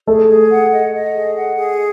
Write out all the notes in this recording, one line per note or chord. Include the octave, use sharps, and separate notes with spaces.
A3 G#4
G#4
F#5
D#5
D#5
G#4
F#5
G#4